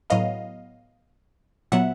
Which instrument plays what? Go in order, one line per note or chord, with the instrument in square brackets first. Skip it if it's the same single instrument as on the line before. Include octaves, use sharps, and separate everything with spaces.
[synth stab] A2 F#3 B3 D#5 F5
A#2 F#3 B3 E5 F#5